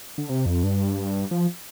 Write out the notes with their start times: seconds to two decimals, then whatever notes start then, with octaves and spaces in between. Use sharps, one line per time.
0.18 D3
0.29 C3
0.46 F2
0.63 G2
1.31 F3